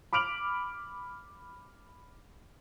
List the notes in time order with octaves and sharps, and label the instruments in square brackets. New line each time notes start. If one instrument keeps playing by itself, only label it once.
[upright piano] B5 D6 F6 D7 F7 F#7